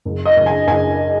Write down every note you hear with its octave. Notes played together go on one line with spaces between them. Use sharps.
F#1
D#5
F#1
G#5
F#1 G#5